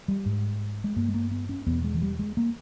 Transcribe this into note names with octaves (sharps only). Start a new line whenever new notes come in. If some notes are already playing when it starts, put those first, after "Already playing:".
G3
G#2
G#3
G2 A#3
G#3
A#3
B3
C#4
E2 B2 B3
G#3
E3
G3
G#3
A#3